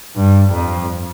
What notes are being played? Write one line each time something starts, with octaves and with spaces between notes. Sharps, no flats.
G2
F2